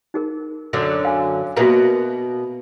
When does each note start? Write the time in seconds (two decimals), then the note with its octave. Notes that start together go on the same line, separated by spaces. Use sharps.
0.14 D#4 G#4 A#4
0.73 F#2 D3 F#3
1.05 F5 G#5
1.57 B2 A#3 F#4 E5 A#5